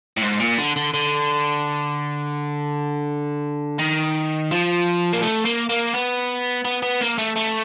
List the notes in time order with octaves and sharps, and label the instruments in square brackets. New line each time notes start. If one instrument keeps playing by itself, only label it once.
[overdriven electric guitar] A2
G#2
A#2
D3
D3
D3
D#3
F3
A#3
A3
A#3
A#3
B3
B3
B3
A#3
A3
A3